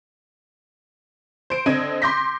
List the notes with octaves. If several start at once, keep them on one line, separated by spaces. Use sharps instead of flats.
C5 D7
D3 C4 D#5 G#6 D#7
C6 D6 G6 A#6 B6